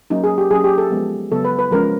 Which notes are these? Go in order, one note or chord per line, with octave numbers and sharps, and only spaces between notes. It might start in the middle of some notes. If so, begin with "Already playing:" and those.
F#3 A#3 C#4 D#4
G#4
G4
F#3 A#3 C#4 G#4
G4
A4
F3 G#3 B3
C#3 F#3 B3 A4
B4
B4
F3 G#3 C#4 A#4